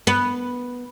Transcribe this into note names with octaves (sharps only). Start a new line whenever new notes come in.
B3